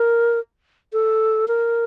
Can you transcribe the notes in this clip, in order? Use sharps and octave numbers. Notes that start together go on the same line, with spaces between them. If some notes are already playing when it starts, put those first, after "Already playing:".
Already playing: A#4
A4
A#4